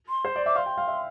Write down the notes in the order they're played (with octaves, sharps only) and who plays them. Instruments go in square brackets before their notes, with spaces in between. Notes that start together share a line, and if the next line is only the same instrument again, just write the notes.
[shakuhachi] C6
[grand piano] C5
D5
[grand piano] E5 [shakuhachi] D6
[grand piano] F5 [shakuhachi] C6
[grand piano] G5
F5
E5